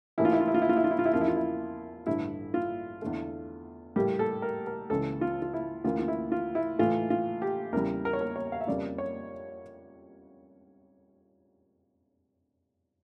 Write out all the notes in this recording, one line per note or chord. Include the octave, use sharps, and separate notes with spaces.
A1 A2 E3 A#3 E4
F4
E4
F4
E4
F4
E4
F4
E4
F4
E4
F4
E4
E2 C#3 F3 A#3 F4
E4
F4
E4
A1 G2 D3 A3 E4
F4
E2 D3 A3
A2 G3 A#3 G4
A4
A#4
A#4
C#2 C#3 E3 A4
F4
F4
E4
D2 C#3 E3 A#3 F4
F4
E4
F4
E4
A2 E3 A3 F4
F4
G4
E2 C#3 G3 A#4
A#4
C#5
A#4
C#5
F5
E5
F2 C#3 G3 A#3 D5
C#5